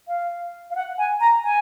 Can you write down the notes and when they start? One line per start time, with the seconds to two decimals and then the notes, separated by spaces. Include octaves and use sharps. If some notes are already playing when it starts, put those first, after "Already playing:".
0.08 F5
0.71 F5
0.76 F#5
0.98 G#5
1.20 A#5
1.44 G#5